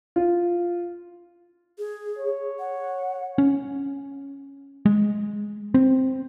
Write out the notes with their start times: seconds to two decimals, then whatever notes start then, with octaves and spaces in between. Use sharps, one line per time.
0.16 F4
1.78 G#4
2.19 C#5
2.59 F#5
3.38 C#4
4.86 G#3
5.74 C4